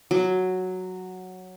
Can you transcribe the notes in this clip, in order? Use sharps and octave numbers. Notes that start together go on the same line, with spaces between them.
F#3